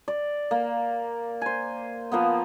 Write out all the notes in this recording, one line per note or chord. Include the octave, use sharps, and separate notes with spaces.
D5
A#3
C5 G#5
F3 A#3 B3